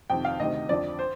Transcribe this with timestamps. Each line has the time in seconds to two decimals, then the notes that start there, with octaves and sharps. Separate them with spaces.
0.10 F2 C3 D#3 G5
0.25 F5
0.40 D2 C3 D#3 D#5
0.69 F2 D3 F3 D5
0.99 C5